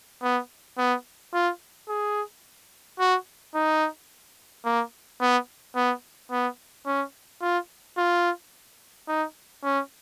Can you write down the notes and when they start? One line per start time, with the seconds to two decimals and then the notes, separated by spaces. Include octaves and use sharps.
0.22 B3
0.78 B3
1.33 F4
1.89 G#4
2.99 F#4
3.54 D#4
4.65 A#3
5.21 B3
5.75 B3
6.31 B3
6.86 C#4
7.42 F4
7.97 F4
9.08 D#4
9.63 C#4